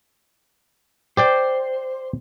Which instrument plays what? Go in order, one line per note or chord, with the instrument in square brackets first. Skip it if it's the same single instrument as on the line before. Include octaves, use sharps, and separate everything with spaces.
[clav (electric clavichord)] G4 D5 G5 [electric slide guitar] C5